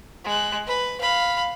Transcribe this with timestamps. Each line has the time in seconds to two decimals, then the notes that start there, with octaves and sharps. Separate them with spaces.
0.24 G#3 F#6
0.67 B4
1.01 F5 B5